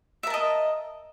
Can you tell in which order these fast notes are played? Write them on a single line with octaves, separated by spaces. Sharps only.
E5 A#4 A5 D#5